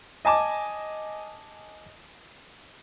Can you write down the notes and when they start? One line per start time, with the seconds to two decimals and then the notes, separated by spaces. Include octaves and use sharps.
0.25 D#5 G#5 A5 D6